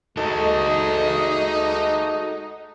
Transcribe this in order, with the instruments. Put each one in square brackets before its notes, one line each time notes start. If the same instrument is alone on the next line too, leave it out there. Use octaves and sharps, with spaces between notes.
[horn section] G#3 A3 D#4 [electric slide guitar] F#4 A4